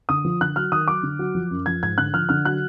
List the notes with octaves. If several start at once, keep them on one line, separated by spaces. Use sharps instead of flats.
D3 D#6
F3
D3 F#6
F#3 F6
D#3 D#6
F#3 D6
D3
F#3
F3
F#2
F3 G#6
G#2 G#6
D3 F#6
F3 F6
D3 F6
F#3 F#6